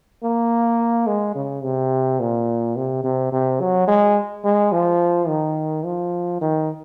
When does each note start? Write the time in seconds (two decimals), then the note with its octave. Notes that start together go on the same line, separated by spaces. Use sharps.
0.23 A#3
1.07 G#3
1.35 C#3
1.63 C3
2.20 A#2
2.76 C3
3.04 C3
3.32 C3
3.60 F#3
3.87 G#3
4.45 G#3
4.72 F3
5.28 D#3
5.84 F3
6.41 D#3